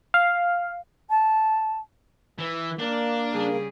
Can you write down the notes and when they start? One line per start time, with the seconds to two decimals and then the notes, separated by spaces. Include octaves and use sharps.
0.14 F5
1.10 A5
2.38 E3
2.79 A#3 D4 A#4
3.31 C#3 G3 G#4